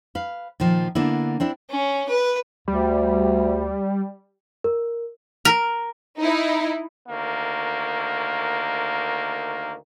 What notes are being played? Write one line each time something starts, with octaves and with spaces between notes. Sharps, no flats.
B4 F5
A#2 D#3 F3
D3 A#3 B3 D4 E4
C4 D4 E4
C#4
B4
D2 G3
A#4
A#4
D#4 E4
D2 D#3 A#3